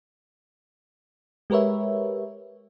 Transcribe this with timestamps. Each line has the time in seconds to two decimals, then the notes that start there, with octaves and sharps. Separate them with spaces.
1.50 G#3 G4 A#4 B4 C#5 E5